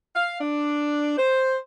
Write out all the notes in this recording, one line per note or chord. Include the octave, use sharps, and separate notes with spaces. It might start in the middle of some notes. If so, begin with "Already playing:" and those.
F5
D4
C5